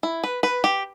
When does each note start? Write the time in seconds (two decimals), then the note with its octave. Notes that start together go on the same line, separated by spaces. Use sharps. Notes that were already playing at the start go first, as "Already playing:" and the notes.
0.03 E4
0.24 B4
0.43 B4
0.64 G4